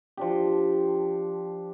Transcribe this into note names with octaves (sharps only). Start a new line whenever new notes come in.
F3 D4 G4